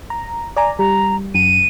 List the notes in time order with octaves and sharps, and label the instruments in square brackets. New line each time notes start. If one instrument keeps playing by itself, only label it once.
[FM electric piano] A#5
D5 G#5 A#5
[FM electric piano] G3 [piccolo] A#5
[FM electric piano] F#2 [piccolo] D#7